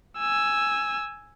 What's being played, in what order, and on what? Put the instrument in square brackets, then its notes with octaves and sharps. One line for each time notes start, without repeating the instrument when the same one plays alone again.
[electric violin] G#5 E6